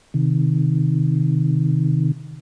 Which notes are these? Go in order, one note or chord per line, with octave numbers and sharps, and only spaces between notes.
C3 D#3